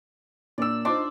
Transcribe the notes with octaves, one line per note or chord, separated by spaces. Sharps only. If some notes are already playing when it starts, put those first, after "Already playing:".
A#2 A#3 D4 D5 E6
D4 D#4 F4 C5 C6 D6